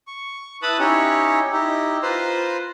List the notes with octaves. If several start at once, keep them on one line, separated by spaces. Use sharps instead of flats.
C#6
E4 B4 A5 B5 D#6 F#6
C#4 D#4 E4 G4 C#5
D#4 E4 G4
F4 B4 C5 A#5 C6